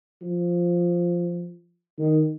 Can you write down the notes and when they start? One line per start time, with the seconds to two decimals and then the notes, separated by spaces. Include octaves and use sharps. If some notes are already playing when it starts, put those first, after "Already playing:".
0.22 F3
1.99 D#3